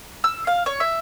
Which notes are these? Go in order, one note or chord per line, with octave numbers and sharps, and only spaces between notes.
E6
F5
C#5
E5